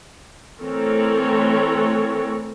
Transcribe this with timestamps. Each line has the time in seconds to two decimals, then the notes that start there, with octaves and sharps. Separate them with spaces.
0.60 E3 A3 C4 A4 A#4 C#5